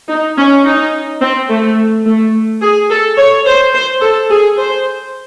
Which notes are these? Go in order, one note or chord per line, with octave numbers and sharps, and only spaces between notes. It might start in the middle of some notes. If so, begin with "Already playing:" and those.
D#4
C#4
D#4
C4
A3
A3
G#4
A4
C#5
C5
C5
A4
G#4
C5